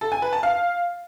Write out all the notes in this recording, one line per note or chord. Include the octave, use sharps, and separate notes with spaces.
A4
G#5
B4
A5
F5